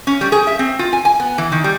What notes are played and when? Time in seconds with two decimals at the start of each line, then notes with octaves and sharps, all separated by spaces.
0.07 C#4
0.21 G3
0.32 G#4
0.47 E5
0.59 C4
0.79 F4
0.93 G#5
1.05 G#5
1.20 B3
1.38 E3
1.52 D#3
1.64 G3